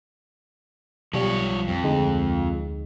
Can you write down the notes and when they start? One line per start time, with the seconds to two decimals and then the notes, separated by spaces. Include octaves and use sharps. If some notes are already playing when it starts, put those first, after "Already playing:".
1.14 B1 F3 G3 C#5
1.68 F2
1.84 D2 G#3 D#4